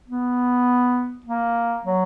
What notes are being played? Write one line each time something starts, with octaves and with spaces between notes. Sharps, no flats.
B3
A#3
F#3